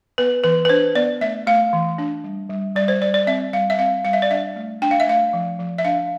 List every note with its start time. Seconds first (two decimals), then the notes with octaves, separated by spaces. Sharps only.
0.18 B3 B4
0.44 E3 B4
0.65 B4
0.69 D4 C5
0.95 B3 D5
1.21 A3 E5
1.47 A3 F5
1.73 E3
1.98 D4
2.24 G3
2.49 G3
2.76 G3 D5
2.88 C5
3.02 G3 D5
3.14 D5
3.27 C4 E5
3.53 G3 F5
3.70 E5
3.79 C4 F5
4.05 G3 F5
4.13 E5
4.22 D5
4.30 D4 E5
4.56 A3
4.82 D4 G5
4.91 F5
5.00 E5
5.07 A3 F5
5.33 F3
5.59 F3
5.78 E5
5.85 D4 F5